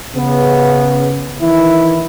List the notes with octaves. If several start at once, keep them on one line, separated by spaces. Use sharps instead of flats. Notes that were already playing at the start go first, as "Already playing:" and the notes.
C#3 B3
D#3 E3 E4